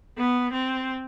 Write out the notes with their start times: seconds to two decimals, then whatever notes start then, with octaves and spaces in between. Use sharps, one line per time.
0.17 B3
0.52 C4